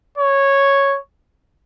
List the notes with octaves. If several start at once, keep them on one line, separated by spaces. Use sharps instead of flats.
C#5